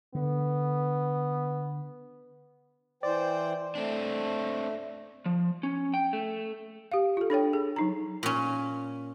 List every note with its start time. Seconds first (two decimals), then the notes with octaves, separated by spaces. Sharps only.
0.15 D3 B3
3.03 E3 C5 D5 G5
3.75 A3 C4 D4
5.26 F3
5.63 C#4
5.94 G5
6.13 A3
6.91 G4 F5
7.17 F4 A4
7.30 D4 A4 C#5 G5
7.53 G#4
7.76 F#3 D#4 A#5
8.23 A#2 C#4